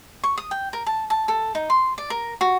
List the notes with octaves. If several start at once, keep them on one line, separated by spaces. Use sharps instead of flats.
C#6
D#6
G5
A#4
A5
A5
A4
D#4
C6
D5
A#4
F#4